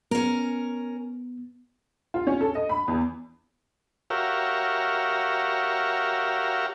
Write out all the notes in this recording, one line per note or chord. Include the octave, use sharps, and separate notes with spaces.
B3 C#4 A#4
F4
C#4
A4
D#5
B5
E2
F#4 G4 A#4 C#5 E5 F5